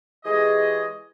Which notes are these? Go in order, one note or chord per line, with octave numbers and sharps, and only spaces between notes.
E3 G#3 G4 G#4 C#5 D#5